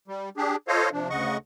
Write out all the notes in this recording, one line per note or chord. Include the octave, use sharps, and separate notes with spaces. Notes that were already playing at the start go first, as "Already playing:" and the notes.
G3
D4 G4 G#4
F4 A4 C5 C#5 D#5 F5
C3 F3 D4
D2 C#3 D#5 F#5 C#6